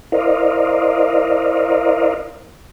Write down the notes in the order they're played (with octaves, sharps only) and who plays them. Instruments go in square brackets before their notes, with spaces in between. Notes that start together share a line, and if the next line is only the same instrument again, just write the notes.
[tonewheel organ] E4 A#4 C5 D5 D#5 F5